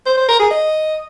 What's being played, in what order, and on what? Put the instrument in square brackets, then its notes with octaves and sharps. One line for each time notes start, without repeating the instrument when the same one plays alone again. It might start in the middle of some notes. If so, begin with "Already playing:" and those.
[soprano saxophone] C5
C5
A#4
G#4
D#5